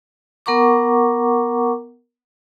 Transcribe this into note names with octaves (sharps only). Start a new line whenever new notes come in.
B3 A#4 F#5 A#5 C#6 D6